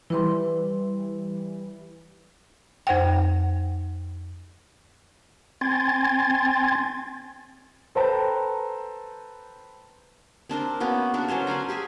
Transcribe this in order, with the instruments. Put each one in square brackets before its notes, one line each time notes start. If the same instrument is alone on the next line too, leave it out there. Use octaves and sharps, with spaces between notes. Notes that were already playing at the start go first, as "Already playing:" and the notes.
[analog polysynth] E3 G3 [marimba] E4 B4 C6
[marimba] F2 C5 F#5 G5
[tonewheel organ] C4 G5 G#5 C6 G#6 A6
[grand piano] A4 B4 C5 G5 A5 A#5
[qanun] C4 D4 A#4 C5
A#3 B3 C#4 F#4
D4 F#4 A4 A#4
F#3 C#4 C5 C#5
D5 F5 G#5 A#5
G4 G#4 E5 G#5